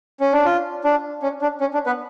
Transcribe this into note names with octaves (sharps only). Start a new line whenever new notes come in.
C#4
D4
F4
D4
C#4
D4
C#4
D4
B3 B4